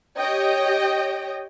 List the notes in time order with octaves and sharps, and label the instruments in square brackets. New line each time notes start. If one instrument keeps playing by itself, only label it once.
[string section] G4 C#5 D#5 G5